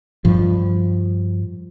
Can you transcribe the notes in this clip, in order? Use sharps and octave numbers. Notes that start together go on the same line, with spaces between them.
G2 F3